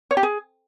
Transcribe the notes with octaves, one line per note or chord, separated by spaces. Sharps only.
C#5
G4
G#4